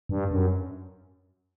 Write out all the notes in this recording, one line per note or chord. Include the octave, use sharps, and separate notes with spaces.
G2
F#2